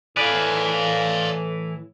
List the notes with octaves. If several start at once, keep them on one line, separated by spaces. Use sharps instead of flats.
A2 E3 G#4 B4 D5 F5